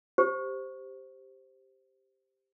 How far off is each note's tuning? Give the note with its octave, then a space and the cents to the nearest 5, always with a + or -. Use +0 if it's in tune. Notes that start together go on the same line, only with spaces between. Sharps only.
G4 +0 C5 +0